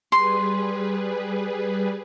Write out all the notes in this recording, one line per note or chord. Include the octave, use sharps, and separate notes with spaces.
G3 G#4 B4 C6